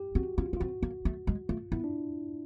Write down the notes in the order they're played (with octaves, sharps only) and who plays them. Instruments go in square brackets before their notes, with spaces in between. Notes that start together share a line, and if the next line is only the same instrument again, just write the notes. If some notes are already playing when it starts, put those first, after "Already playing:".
Already playing: [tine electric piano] G4
[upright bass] C4 [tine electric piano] F#4
[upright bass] C#4 [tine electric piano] F4
[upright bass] B3
[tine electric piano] F4
[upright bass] C4 [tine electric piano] F#4
[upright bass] A#3
A3
G#3
[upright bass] A3 [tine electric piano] F4
[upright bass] B3 [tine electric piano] E4
[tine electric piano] D4